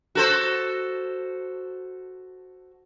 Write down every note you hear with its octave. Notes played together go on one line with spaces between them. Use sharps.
F#4 A4 C5